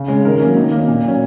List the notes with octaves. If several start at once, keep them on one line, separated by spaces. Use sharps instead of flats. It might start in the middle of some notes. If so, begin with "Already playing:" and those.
Already playing: C#3
G#3 C#4
D#3 A#4
F#3 A#3 C#4
D#3
A#3 C#4
A#2
F#3 C#4